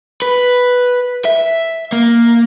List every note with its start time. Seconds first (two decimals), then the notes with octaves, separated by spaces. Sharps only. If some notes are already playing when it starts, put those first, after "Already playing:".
0.22 B4
1.25 E5
1.92 A#3